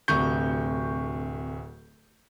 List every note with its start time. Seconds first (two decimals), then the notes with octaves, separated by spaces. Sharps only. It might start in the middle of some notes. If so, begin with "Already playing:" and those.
0.08 D1 D2 C3 C#6 G6